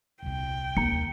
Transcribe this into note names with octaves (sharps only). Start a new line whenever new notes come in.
D#1 C2 G5
D#2 A#5 C#7